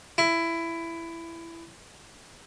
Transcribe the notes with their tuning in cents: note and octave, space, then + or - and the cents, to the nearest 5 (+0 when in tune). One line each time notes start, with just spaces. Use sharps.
E4 +15